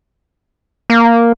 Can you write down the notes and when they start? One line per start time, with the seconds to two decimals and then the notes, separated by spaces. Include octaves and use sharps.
0.90 A#3